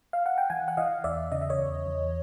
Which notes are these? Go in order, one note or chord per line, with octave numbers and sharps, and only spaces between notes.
F5
F#5
G5
E3 F#5 G#5
F#5
E3 D#5 F5
E2 D5 E5
C#3 D#5
E5
C#5 D#5
E2
E2